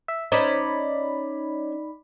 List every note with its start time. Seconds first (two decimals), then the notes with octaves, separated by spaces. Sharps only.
0.08 E5
0.32 C#4 D#4 C5 D5 B5